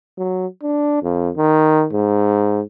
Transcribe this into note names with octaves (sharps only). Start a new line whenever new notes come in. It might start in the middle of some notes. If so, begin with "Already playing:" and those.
F#3
D4
F2
D#3
G#2